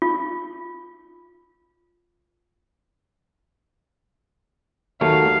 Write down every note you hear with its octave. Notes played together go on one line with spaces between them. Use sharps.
F4
D#2 F#3 A3 F5